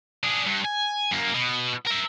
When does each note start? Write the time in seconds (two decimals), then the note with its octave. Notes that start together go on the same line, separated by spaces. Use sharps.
0.23 D4 G#4
0.47 G2
0.65 G#5
1.11 F#2 A#3
1.34 B2
1.86 A#4 E5